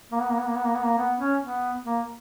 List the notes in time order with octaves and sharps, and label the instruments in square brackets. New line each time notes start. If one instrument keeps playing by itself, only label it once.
[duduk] A#3
B3
A#3
B3
A#3
B3
A#3
B3
A#3
B3
C#4
B3
A#3